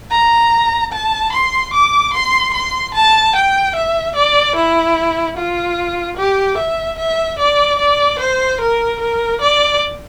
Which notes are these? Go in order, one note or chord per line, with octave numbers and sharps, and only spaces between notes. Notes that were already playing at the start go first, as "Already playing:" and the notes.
A#5
A5
C6
D6
C6
C6
A5
G5
E5
D5
E4
F4
G4
E5
E5
D5
D5
C5
A#4
A#4
D5